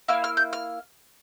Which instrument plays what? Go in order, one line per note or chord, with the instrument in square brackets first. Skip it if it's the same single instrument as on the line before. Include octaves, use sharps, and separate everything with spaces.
[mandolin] A#3 E4 F6
F6
G6
F6